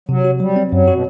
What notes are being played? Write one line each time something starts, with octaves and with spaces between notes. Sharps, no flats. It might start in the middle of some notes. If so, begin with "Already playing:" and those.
C3 F#3
F#4
F#3 G3
C4
F#2 F#3
B2 F#4